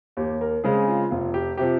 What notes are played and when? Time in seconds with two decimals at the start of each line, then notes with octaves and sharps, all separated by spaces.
0.17 D#2 G4
0.41 A#4
0.64 C#3 G#3 C4 G#4
0.88 F4
1.11 F1 F4
1.34 G4
1.57 C3 F3 G4